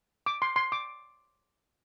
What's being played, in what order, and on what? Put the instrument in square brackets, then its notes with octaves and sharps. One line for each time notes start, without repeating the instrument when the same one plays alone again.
[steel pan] D6
C6
C6
D6